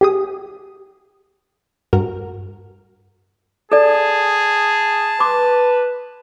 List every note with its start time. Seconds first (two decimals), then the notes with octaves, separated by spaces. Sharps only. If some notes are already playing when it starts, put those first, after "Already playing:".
0.01 G4 G#4 D#6
1.93 G2 F#4 A#4
3.72 G#4 A4 D5 A5
5.20 B4 C6 D6